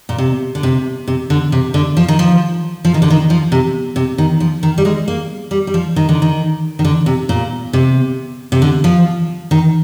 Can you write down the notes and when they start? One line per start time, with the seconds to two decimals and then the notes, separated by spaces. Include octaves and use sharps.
0.09 A#2
0.18 C3
0.55 D3
0.63 C3
1.07 C3
1.30 D3
1.52 C3
1.74 D3
1.97 F3
2.08 D#3
2.19 F3
2.85 F3
2.94 D#3
3.02 D3
3.10 D#3
3.30 F3
3.52 C3
3.96 C3
4.18 D#3
4.40 F3
4.63 D#3
4.78 G3
4.85 G#3
5.08 A#3
5.51 G3
5.67 G3
5.74 F3
5.96 D#3
6.09 D3
6.22 D#3
6.79 D#3
6.85 D3
7.06 C3
7.29 A#2
7.73 C3
8.52 C3
8.62 D3
8.84 F3
9.51 D#3